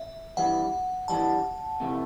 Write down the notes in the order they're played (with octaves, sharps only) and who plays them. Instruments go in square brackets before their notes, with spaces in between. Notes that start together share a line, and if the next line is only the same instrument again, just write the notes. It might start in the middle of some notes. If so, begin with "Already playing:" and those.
Already playing: [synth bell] E5
[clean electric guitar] G2 E3 G3 [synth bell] F#5
[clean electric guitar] G2 E3 G3 [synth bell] A5
[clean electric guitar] C3 E3 A3